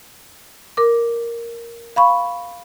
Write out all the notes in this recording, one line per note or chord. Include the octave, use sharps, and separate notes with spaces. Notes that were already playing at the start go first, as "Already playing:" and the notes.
A#4 D6
F5 B5 C#6